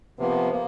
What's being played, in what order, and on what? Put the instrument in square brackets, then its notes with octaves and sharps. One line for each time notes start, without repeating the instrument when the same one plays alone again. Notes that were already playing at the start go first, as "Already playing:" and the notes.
[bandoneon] C3 F3 A#3 [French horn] B3
[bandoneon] A#3